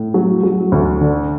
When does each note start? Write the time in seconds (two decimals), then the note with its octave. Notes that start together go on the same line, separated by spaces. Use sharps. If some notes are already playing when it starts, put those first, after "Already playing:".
Already playing: A2
0.14 F#3
0.43 F#3
0.72 D2
1.01 D3